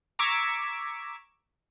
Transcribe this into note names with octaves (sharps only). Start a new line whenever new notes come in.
A#5 C#6 D6 E6 G#6 B6